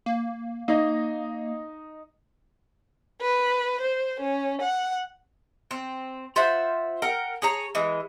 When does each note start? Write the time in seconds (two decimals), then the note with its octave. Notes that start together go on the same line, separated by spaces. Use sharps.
0.06 A#3
0.68 A#3 D#4 D#5
3.21 B4
3.81 C5
4.20 C#4
4.61 F#5
5.71 C4
6.36 F4 C5 E5 F#5
7.02 A#4 F#5 G5
7.42 G#4 C#5 A#5
7.75 E3 G#3